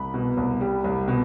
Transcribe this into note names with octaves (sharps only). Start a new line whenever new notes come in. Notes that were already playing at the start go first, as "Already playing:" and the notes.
Already playing: C2 B5
B2
C2
G3
C2
B2